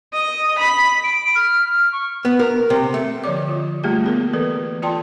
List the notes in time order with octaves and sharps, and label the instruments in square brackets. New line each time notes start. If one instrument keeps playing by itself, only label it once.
[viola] D#5
B5
[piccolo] D7
F6
F6
C#6
[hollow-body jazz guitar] B3
A#4
C3
A3
[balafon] D3 F3 G4 C#5 D5 D6
F4
G3 A3 A#3 F4 G4 G#4
B3 G#4 A#4
E3 A4 B4
F4 D5 G5 A5 C6